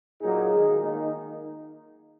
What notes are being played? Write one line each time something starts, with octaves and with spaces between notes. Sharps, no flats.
A#2 F#3 A#3 D#4 G#4
D#3 G#3
D#3 A#3 D#4